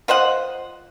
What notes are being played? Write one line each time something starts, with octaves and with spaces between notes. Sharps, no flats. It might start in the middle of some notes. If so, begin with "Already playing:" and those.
F4 C5 D#5 F#5